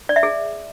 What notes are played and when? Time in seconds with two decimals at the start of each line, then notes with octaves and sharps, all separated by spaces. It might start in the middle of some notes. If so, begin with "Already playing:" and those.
0.09 D5
0.16 E5
0.23 G#4